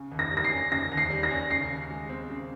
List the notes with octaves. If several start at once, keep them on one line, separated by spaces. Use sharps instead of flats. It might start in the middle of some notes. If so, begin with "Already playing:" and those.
Already playing: C#3
D#2
A#6
G3
A#6
C7
C#4
C#3 A#6
D#2
C7
G3
A#6
C#4
C#3 C7
D#2
G#3
C4
C#3